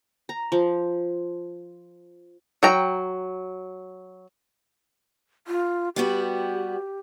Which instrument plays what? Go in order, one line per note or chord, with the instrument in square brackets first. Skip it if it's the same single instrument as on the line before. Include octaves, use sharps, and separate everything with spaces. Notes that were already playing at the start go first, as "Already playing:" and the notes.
[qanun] A#5
F3
[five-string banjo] F#3 G5 A#5
[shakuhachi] F4
[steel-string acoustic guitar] G3 B3 F#4 [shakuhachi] G4